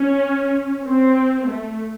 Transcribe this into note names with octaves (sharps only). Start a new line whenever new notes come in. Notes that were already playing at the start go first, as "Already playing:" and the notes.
Already playing: C#4
C4
A3